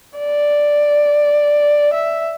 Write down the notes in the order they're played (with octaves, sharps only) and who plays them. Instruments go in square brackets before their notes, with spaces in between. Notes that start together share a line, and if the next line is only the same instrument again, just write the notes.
[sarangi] D5
E5